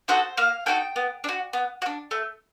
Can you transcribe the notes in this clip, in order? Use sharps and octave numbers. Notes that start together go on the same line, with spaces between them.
D#4 F#4 A4 C5
A#3 F5
D#4 F#4 A4 G5
B3
D4
F#4
B3
F#4
D4
A3